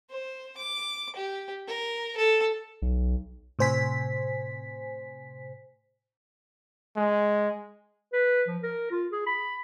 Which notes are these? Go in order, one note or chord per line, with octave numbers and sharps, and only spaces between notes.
C5
D6
G4
A#4
A4
B1
A2 C3 C5 G#5 B6
G#3
B4
F3
A#4
F4
G#4
B5